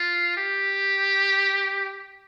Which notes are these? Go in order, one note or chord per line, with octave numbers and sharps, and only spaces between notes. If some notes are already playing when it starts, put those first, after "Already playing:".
Already playing: F4
G4